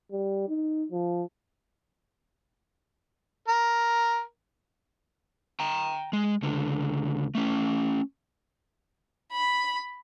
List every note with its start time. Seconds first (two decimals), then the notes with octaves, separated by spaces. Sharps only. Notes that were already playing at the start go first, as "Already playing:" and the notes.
0.11 G3
0.48 D#4
0.92 F3
3.48 A#4
5.60 G5 A#5
6.13 G#3
6.42 C#2 D3
7.35 A3 C#4
9.32 B5